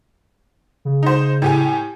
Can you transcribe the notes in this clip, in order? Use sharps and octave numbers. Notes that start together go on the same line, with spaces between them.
C#3
D#4 C5
A2 G4 G#5